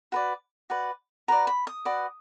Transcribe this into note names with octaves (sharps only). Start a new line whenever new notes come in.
F#4 B4 D5
F#4 B4 D5
F#4 B4 D5 A#5
B5
D#6
F#4 B4 D5